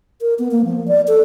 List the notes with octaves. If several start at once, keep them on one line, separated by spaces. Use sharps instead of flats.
A#4
B3
A#3
F3
D5
A4